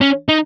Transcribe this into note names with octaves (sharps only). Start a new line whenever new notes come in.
C#4
D#4